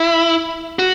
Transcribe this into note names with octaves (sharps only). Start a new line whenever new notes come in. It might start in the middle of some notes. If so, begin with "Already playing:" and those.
Already playing: E4
F#4